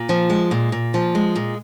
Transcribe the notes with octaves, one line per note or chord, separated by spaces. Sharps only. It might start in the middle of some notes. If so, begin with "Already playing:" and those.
Already playing: A#2
F3
G#3
A#2
A#2
F3
G#3
A#2